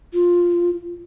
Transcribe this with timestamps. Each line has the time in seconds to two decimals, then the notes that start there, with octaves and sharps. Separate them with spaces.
0.14 F4